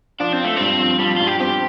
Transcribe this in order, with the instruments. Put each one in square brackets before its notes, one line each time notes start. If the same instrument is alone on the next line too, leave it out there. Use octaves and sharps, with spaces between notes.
[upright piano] F3 [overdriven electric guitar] D4
[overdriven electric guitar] C4
[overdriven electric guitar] A3 [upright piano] F4
[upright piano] G2 [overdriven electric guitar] C4
[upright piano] F3
[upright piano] F3 [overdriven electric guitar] G3
[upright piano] G2 [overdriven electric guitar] F4
[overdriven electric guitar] G4
[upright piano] C4 [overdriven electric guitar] G4